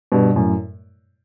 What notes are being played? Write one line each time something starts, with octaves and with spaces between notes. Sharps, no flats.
G2 B2
F#2 A2